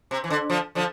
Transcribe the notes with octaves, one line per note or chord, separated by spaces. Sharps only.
C3
E3
D3
D3 F3
D3 F3